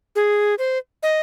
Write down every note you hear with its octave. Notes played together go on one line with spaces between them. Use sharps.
G#4
C5
D#5